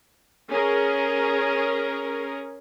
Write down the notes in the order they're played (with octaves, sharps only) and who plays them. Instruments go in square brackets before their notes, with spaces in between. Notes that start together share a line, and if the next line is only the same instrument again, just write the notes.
[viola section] C#4 G#4 A#4